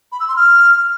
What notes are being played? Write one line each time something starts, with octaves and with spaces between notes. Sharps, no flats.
B5
E6
C6
F6